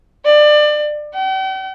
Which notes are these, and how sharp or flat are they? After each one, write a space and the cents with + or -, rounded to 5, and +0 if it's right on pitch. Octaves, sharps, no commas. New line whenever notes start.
D5 +25
G5 -45